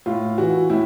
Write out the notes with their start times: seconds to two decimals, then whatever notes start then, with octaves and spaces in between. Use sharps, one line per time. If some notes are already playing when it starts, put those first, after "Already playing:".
0.06 A2 F4
0.38 E3 F#4
0.70 A2 E4